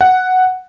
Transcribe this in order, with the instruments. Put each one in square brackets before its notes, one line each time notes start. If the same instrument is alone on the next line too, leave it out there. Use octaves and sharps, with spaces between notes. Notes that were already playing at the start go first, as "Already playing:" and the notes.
[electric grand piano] F#5